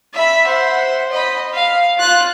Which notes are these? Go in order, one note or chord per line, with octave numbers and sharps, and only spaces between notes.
E5 B5
C5 F#5
D#5 B5
F5
F4 F#6